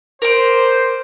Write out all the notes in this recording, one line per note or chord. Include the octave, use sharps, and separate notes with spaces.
A#4 C5 D5